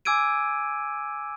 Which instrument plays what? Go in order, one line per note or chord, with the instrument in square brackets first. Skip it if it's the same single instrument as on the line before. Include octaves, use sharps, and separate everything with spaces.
[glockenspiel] G#5 D6 E6 G#6 D7 D#7